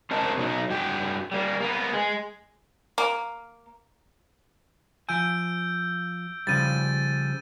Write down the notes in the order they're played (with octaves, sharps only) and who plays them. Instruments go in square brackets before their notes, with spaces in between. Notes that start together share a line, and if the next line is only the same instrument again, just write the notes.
[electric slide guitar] C#4 A#4 C5 D#5 F#5 A5
B2 F#3 D#4
G2 F#4 G5
G3 A#3
A#3 B3
G#3
[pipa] A#3
[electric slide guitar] F3 G#5 [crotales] E6 G6 D7
[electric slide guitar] C#3 F3 G3 [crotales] A6 D#7